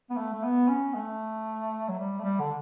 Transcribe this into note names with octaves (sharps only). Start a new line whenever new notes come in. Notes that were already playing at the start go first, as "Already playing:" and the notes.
B3
A3
A3
B3
C#4
A3
F#3
G3
A3
G3
D3